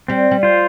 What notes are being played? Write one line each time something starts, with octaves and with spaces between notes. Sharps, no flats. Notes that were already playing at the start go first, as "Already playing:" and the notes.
G3 C4
G3
F4 C5